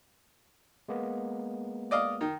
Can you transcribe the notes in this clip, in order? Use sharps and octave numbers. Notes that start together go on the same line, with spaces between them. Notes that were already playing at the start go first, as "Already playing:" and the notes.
G#3 A#3 B3
D5 D#5 F5
D#3